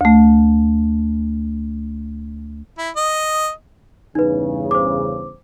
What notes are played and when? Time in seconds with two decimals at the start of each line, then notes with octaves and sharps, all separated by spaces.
0.01 D2 A3
2.78 E4
2.97 D#5
4.15 E2 G2 C#3 D#4 B4
4.71 C5 D6